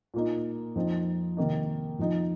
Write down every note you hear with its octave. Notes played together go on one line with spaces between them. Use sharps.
A#2 A#3 D#4
F2 F3 C4 D#4
C3 D#3 A#3 D#4
F2 F3 D#4